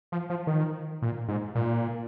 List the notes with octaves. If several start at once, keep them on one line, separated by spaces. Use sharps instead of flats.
F3
F3
D#3
A#2
G#2
A#2